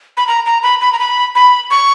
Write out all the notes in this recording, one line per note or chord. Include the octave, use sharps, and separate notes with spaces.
B5
A#5
A#5
B5
B5
A#5
B5
B5
C#6